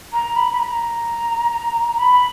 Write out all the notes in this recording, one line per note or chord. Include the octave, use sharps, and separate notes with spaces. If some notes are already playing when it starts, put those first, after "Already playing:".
A#5
B5
B5
A#5
B5